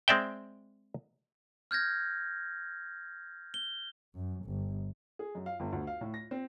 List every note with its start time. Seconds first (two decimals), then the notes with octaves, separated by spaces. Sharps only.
0.08 G#3 C4 D5 E5 G5
1.71 F6 G6 G#6 A#6
3.54 G7
4.15 F#2
4.45 G1
5.19 G#4
5.35 F#2
5.46 F5
5.60 G1
5.72 D2
5.87 F5
6.01 A2
6.14 A#6
6.31 C4